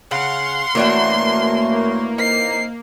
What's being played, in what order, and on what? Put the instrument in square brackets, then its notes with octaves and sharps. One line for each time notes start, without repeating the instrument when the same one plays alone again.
[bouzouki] C#3 [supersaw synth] F5 F#5 [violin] C6
[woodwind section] F#2 A3 [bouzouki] E3 D4 F#4 [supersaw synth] A#3
[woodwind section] C4 D#4 A#4 [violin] C7